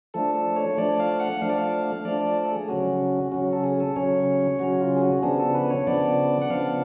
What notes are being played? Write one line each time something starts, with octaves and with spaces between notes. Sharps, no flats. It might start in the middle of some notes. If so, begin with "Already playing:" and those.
F3 A3 D4 A4
A4
C#5
F3 A3 D4 D5
F5
F#5
F3 A3 D4 F5
D5
F5
F3 A3 D4 D5
D5
A4
G#4
C#3 F#3 C#4 F#4
C#3 F#3 C#4 F#4
A4
G#4
A4
C#3 F#3 C#4 C#5
C#3 F#3 C#4 F#4
F4
G#4
F#4
C#3 F3 B3 D4 G#4
A4
B4
C#5
C#3 F3 B3 D4 D5
F#5
C#3 F3 B3 D4 F5